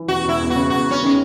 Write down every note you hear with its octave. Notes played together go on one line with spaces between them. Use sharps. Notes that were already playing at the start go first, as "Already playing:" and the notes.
Already playing: E3
E1 F#4
E1 E4
E2
C#3 F#4
E2 F#4
E2
C#4
D#3 G#3